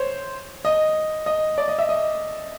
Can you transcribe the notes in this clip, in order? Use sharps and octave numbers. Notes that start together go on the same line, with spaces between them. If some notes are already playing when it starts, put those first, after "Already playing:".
Already playing: C5 C#5
D#5
D#5
D5
D#5
E5
D#5